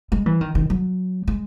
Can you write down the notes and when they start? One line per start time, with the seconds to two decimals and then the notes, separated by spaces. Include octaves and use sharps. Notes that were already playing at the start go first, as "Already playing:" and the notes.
0.12 G#3
0.26 E3
0.41 D#3
0.55 D#3
0.70 F#3
1.28 G#3